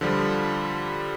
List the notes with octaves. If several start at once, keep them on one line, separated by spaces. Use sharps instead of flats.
D3 F3 G3